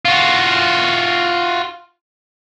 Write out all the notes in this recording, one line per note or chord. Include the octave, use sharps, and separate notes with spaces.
F4 F#4